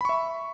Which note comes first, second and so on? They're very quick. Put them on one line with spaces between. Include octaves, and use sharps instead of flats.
B5 C#6 E5